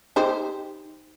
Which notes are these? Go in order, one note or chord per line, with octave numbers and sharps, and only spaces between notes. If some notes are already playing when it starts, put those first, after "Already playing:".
D#4 G4 C5